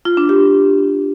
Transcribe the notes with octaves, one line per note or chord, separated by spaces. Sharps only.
F4
D4
G4